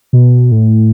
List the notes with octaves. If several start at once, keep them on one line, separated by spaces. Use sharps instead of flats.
B2
A2